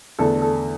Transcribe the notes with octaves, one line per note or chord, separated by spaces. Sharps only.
E2 D3 A3 D4 A4
A4